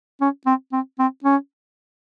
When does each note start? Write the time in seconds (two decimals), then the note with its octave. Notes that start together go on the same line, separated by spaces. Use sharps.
0.21 C#4
0.46 C4
0.72 C4
0.99 C4
1.24 C#4